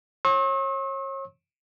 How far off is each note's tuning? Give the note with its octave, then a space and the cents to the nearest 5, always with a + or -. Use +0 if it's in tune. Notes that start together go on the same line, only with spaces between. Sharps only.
C#5 -35 C#6 -45 E6 -40